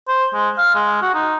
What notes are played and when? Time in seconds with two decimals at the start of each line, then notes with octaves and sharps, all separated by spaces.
0.08 C5
0.34 G#3
0.58 F5
0.75 G#3
1.02 F#4
1.14 D#4